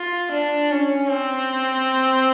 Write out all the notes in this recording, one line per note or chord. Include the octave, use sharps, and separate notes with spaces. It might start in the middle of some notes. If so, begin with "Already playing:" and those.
Already playing: F4
D4
C#4
C4